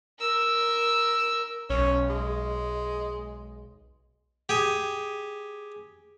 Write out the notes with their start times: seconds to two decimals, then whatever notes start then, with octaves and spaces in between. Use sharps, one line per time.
0.19 A#4 E6
1.70 B1 C#4
2.09 G#3
4.49 G4 G#4